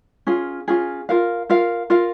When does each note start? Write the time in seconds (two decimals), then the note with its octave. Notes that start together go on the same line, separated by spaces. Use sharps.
0.27 C#4 F4 G#4
0.68 C#4 F4 G#4
1.09 F4 A#4 F5
1.49 F4 A#4 F5
1.90 F4 A#4 F5